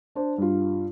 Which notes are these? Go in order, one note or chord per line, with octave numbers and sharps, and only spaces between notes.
D4 C5
G2 F4